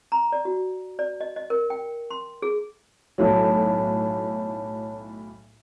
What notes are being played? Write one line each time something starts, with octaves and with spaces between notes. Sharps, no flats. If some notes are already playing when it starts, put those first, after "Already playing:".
A#5
D5
F#4
D5
D#5
D#5
A#4
G5
C6
G#4
B1 A2 F#3 C#5 A5